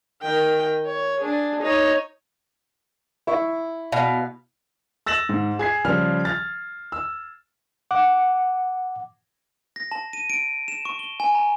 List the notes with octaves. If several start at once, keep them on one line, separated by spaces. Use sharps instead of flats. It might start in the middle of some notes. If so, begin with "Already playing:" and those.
D#3 G5
C#5
D4 G#4
D#4 C#5
E4 C#6
B2 F5
E6 A6 A#6 E7 F#7
G#2
G#4 G#6 C7
C#3 F3 G3 F6
F6 A6
E6
F#5 D6
A#6
A5
D#7
D7
E7
C#6
G7
G#5
A#5